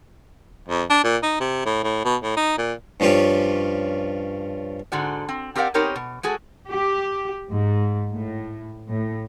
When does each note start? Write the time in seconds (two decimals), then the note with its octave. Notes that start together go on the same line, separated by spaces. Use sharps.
0.69 F2
0.90 D4
1.04 A#2
1.23 D#4
1.40 C3
1.66 A2
1.83 A2
2.05 B2
2.23 A2
2.37 D#4
2.58 A#2
3.00 G2 F3 C#4 F4 G4
4.92 G#2 D3 G#3 F#4 D5
5.29 C4
5.56 C4 G4 A#4 D5 F5 F#5
5.74 B3 C4 D#4 G4 A#4 C#5
5.96 B2
6.23 G#3 F#4 G#4 A4
6.70 G4
7.49 G#2
8.13 A2
8.89 A2